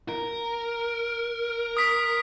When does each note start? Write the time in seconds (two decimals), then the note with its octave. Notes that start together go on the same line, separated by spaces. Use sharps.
0.09 A#4
1.77 D#6 B6